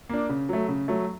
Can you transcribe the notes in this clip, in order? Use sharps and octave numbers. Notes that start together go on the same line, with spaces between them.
A#3 D4
C#3
F#3 A3
C#3
F#3 A3